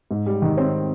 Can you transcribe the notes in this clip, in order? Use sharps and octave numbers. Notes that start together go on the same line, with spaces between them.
G#2
G3
D#3
C4